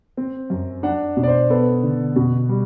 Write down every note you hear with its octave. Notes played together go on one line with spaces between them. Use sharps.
C4
F#2
D4 F#5
B2
D5
C5
B3 A4
D3
B2 F#4
G3